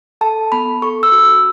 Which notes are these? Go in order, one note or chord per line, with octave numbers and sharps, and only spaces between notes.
A4 A5
B3 B5
A4 C#6
E6
F#4